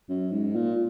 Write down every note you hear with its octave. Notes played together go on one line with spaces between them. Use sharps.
F#2
G#2
A#2